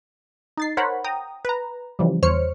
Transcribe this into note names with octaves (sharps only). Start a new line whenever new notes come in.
D#4 A6 C7
A#4 C5 C#5 F#5 B5
G5 A#5 D#6
B4 A#5
C#3 E3 F3 G3
E2 C5 C#5 F6 C#7